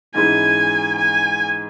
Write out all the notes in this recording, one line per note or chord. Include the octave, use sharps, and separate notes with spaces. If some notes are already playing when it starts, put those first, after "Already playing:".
G#2 E3 G#3 C#4 E4 G#5
G#5